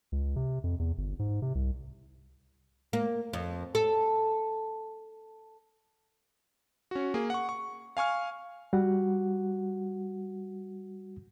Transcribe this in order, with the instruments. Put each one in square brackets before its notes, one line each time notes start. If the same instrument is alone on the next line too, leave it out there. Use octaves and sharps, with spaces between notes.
[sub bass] C#2
C3
F2
E2
G1
G#2
C3
C2
[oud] A#3
F2
A4
[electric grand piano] C#4 F#4
A#3 G#4
F#5 C#6
C#6
F5 G#5 C#6 F6
[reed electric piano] G3 F#4 F#5